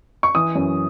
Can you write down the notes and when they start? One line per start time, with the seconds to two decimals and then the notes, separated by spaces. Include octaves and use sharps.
0.23 C#6
0.35 E3 D#6
0.55 F#2